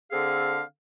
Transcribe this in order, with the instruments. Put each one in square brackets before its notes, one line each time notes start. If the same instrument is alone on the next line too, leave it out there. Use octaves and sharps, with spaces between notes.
[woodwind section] D3 C4 G#4 A4 F5